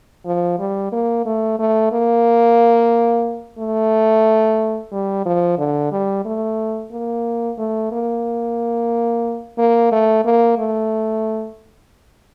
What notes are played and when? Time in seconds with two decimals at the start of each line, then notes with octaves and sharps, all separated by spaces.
0.25 F3
0.59 G3
0.92 A#3
1.25 A3
1.59 A3
1.92 A#3
3.58 A3
4.92 G3
5.25 F3
5.58 D3
5.92 G3
6.25 A3
6.92 A#3
7.58 A3
7.91 A#3
9.58 A#3
9.92 A3
10.25 A#3
10.58 A3